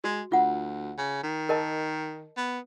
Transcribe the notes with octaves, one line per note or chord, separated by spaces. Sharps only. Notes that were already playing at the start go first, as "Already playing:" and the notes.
G#3 F#4
D2 F4 F#5
C#3
D#3
A#4 D#5 A5
B3